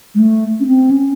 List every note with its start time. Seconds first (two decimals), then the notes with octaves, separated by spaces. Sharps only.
0.15 G#3
0.19 A3
0.60 C#4
0.67 C4
0.91 C#4